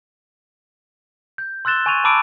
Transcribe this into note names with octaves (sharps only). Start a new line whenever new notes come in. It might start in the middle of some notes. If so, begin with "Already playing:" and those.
G6
C6 E6 F#6 A6 E7 G7
G#5 C#6 G#6 D#7 F7
A5 B5 D6 E6 D7 D#7